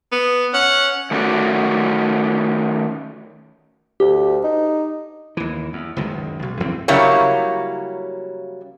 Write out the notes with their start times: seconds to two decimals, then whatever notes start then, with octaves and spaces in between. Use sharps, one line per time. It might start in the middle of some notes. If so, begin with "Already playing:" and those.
0.12 B3
0.54 C#4 F#5
1.11 D#3 A3 C#4 F#4 D5
4.00 D2 G4
4.44 D#4
5.37 D#2 E3
5.73 E2
5.97 F#1 C#2 B2 D#3
6.42 B1
6.60 E2 E3 F3 C4
6.88 C#3 F#3 G3 A#3 E4 C#5